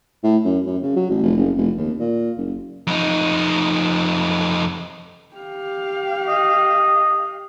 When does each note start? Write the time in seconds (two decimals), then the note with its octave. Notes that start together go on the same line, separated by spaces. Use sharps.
0.23 A2
0.45 F#2
0.66 F#2
0.83 C#3
0.96 F#3
1.09 A1
1.23 F1
1.37 F#1
1.57 F1
1.77 D#2
2.00 A#2
2.37 F#1
2.87 F2 D#4
5.36 G4 F5
6.28 D#5